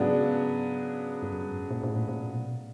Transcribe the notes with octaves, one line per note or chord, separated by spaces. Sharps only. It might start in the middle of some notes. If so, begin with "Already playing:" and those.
Already playing: G#2 C#3 F#3 B3 D4
G2
F#2
G2
G#2
A#2
A#2
A2
A#2
B2